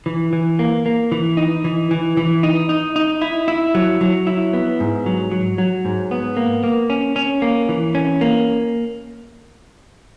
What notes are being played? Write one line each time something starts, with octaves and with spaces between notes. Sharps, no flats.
E3
E3
A#3
A#3
E3
D#4
E3
E3
E3
D#4
D#4
D#4
E4
E4
F#3
F#3
E4
B3
G#2
F#3
F#3
F#3
G#2
B3
A#3
A#3
C#4
C#4
A#3
E3
C#4
A#3